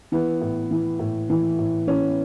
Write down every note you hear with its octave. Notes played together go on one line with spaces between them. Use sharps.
E3 B3
A2
E3
A2
E3
A2
E3 C#4